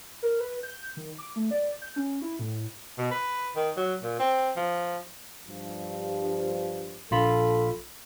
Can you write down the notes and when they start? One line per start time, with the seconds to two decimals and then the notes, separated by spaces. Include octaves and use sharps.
0.23 A#4
0.40 B4
0.63 G6
0.97 D#3
1.18 D6
1.36 A3
1.51 D5
1.82 G6
1.96 C#4
2.22 E4
2.39 A2
2.98 B2
3.11 B4
3.56 D#3
3.77 F#3
4.03 A#2
4.19 C4
4.57 F3
5.47 G2 F3
7.11 A#1 F4 A4 B5